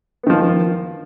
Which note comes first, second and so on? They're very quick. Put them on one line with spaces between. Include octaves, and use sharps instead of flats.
B3 D#3 F3